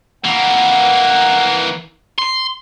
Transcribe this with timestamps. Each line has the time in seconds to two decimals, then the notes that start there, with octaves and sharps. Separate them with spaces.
0.25 E3 A#3 F#5
2.19 C6